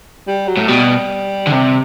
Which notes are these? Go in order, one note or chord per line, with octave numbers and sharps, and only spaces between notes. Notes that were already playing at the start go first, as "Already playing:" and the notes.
G3
F#3
A2
B2 G3
D3
C3